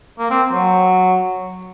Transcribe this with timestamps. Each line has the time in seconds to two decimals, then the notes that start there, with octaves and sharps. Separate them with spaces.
0.19 A#3
0.30 C4
0.52 F#3